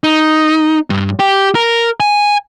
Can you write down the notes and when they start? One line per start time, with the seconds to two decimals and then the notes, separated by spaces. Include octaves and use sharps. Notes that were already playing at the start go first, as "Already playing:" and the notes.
0.04 D#4
0.90 G2
1.19 G4
1.55 A#4
2.00 G#5